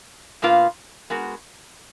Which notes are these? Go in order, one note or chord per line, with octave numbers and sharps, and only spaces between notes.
B2 A#3 F4 B4 F5
G#3 B3 F#4 A#4